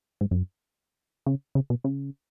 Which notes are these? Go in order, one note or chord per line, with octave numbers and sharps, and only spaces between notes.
G#2
F#2
C#3
C#3
B2
C#3